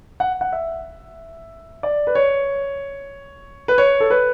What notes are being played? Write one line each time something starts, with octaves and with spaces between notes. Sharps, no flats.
F#5
F#5
E5
D5
B4
C#5
B4
C#5
A4
B4